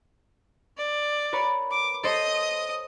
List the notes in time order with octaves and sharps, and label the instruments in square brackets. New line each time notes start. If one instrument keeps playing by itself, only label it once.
[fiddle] D5
[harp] A#4 B4 C#5
[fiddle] D6
[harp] A4 C5 C#5 [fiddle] D#5 D#6